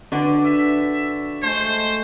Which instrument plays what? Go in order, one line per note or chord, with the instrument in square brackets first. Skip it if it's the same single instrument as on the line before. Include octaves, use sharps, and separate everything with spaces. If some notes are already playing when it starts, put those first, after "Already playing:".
[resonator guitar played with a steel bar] D3 D4 [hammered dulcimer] F#4 B4 D5
[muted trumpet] E5
[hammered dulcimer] G#3 A3 [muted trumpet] C5